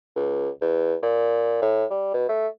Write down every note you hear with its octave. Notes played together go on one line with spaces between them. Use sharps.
C#2
E2
A#2
A2
G3
B2
A3